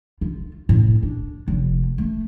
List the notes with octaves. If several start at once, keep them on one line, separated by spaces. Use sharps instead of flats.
F4
A2
D4
F1
A3